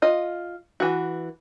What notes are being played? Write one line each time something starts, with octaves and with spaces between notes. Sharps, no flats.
F4 D#5
E3 F#4